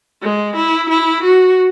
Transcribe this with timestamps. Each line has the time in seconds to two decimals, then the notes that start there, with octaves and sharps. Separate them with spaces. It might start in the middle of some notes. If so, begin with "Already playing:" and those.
0.22 G#3
0.56 E4
0.90 E4
1.24 F#4